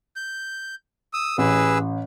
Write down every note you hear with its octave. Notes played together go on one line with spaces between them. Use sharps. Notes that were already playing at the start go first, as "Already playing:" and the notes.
G6
D#6 E6
A1 G#4 B4 E6